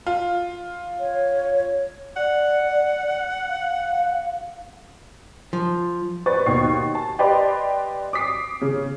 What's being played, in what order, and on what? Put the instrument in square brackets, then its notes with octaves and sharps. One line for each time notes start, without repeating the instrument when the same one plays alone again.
[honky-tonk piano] F4
[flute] C#5
[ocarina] D5 [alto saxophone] F#5
[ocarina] F5
[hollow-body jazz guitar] F3
[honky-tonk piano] B4 C5 D5 C#6 A6
D#2 B2 C#6 C7
A5
G4 B4 D5 D#5 B5 C6
D6 D#6 B6 C7
C#3